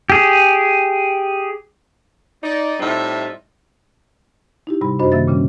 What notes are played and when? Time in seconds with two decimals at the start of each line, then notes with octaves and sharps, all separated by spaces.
0.10 G4 G#4
2.43 D#4 D5
2.80 A2 G3 C4 D#4 F4 E5
4.67 D#4 E4 G4
4.81 G#2 C3 G3 B5
4.99 F#2 D4 F#4 C5 D#5 B5
5.12 C3 D#3 A#3 E5 A6
5.28 A#2 C#3 G3 C#4